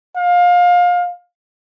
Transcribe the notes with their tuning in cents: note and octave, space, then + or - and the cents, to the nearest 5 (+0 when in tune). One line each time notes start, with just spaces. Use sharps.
F5 +25